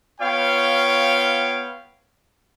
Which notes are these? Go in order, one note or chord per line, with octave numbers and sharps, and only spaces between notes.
B3 F4 C#5 F5 G5